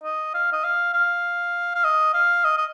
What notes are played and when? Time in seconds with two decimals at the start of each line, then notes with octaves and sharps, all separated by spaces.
0.04 D#5
0.34 F5
0.53 D#5
0.64 F5
0.94 F5
1.75 F5
1.84 D#5
2.14 F5
2.45 D#5
2.58 D#5